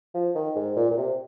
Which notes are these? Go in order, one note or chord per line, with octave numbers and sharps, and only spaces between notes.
F3
D#3
G#2
A#2
A#2
C3